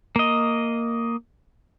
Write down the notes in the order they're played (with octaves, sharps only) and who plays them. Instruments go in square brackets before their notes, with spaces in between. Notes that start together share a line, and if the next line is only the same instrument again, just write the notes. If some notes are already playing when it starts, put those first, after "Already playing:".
[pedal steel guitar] A#3 D#5